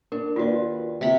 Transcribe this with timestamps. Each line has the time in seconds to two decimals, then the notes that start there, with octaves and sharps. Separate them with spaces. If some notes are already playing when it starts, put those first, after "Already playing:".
0.12 D4 A#4
0.36 D#2 F4 F#4 B4 D5
1.01 C3 B5